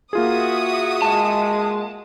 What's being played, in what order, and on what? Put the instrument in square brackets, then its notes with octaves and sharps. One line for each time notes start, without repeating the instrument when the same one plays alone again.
[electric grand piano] A#3 F4 G#4 [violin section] F#4 E5 D#6
[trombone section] G#3 [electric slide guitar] A5